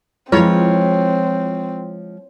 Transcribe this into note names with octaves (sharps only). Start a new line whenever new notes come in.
F3 G#3 C4 E4 F4 B4 C#5